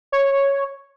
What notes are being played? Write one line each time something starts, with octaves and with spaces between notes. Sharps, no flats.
C#5